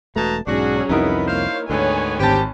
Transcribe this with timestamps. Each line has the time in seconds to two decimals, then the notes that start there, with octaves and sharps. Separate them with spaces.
0.16 E1 B2 A3 A5 A#5
0.47 B1 G#2 F#3 C#4 D4 F#4 G#4
0.89 C2 F2 B3 D#4 E4 A#4
1.27 A#3 C5 C#5 F5
1.70 D2 G#2 D3 D#3 B3 C#5 G#5
2.19 G#1 C4 G4 A5